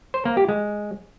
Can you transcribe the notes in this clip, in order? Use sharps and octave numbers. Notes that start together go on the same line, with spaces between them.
C5
A#3
G4
G#3